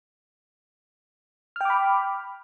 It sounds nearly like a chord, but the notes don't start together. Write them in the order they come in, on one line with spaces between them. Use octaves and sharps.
F6 G5 D6 B5